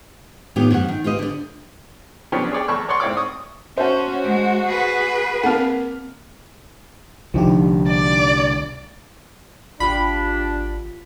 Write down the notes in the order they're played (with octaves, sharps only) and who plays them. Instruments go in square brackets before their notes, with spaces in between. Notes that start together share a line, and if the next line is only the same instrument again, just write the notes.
[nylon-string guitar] A2 D#3 B3 F4 G4
F#2 F#5
D#3
F4 G4 B4 D#5
D3 D5
[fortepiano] F3 B3 C#4 D4 G4 C#5
G#4 C#5 D5 G5
E2 A4 B5 C#6
C#5 D5 F#5 C6 C#6
G#2 C4 E4 C#5 D5 D6
C#6 D#6
[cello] C#4 [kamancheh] F#4 [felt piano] C5 E5 A5
[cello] G#3
G#4 B4
[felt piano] A#3 F6 [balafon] C4 F#5
[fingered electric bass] C2 D3 [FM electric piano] F3 D#4 G4
[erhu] D5
[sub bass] G#1 [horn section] D4 [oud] F4 G4 [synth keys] B5